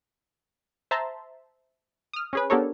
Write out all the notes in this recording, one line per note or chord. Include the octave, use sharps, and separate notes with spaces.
C5 E5 A5 A#5 C6
D#6 F6
C#4 G#4 B4
B3 D4 G4 A4 A#4 C#5